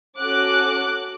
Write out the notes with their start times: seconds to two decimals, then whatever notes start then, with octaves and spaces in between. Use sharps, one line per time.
0.19 C#4 F#4 A4 D6 F#6